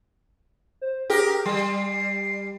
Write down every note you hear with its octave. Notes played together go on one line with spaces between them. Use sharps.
C5
G4 G#4 A#4
G3 C7